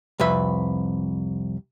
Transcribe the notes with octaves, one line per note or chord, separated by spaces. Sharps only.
C2 F2 B4 E5